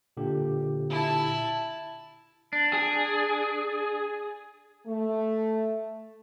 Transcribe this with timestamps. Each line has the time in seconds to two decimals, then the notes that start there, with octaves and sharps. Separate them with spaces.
0.17 A#2 D3 G4
0.90 E4 A5
2.53 D4
2.73 G#4
4.87 A3